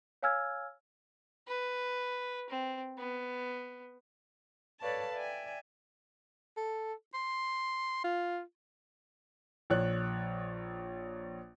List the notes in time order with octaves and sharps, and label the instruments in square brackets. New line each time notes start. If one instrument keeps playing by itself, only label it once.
[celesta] C#5 F5 G#5 E6 F6 G#6
[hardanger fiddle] B4
C4
B3
[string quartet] A4 B4 C#5 D5 F5 A5
D5 E5 G5 G#5
[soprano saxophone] A4
C6
F4
[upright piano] A#1 C#5 F#6